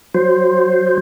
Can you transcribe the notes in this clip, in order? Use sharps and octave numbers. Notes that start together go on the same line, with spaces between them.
F#3 C5